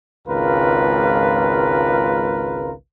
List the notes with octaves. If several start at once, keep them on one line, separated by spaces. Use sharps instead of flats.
G#1 C#2 F4 A#4 B4